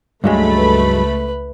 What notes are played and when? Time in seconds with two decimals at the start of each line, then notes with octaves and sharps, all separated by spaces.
0.24 C#2 G2 F#3 G#3 A3 B5
0.57 B4